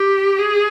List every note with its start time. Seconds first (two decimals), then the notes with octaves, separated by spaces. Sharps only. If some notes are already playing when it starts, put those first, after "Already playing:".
Already playing: G4
0.38 G#4